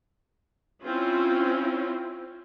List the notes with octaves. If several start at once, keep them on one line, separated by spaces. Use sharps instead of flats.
C4 C#4 E4 F4